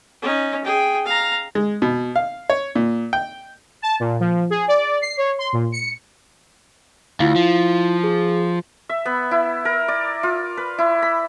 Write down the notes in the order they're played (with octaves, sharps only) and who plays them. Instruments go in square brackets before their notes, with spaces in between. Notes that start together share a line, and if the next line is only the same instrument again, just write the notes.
[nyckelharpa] C#4 D#4
G#4 G5
F5 A#5
[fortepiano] G#3
B2
F5
C#5
A#2
G5
[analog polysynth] A5
A#2
F3
G#4
D5
C7
C#5
C6
A#2
C#7
[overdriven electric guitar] D2 [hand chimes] E4 F4 F5
[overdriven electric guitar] F3
[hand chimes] G#4
[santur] E5
B3
E4
A#4
D5
F4
B4
E4
B5